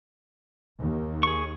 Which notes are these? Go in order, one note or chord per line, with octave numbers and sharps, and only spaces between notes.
D#2
G#4 C#6